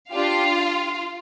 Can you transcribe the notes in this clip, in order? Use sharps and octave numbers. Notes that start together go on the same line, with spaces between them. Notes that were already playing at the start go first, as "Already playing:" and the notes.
D4 F4 G4 F5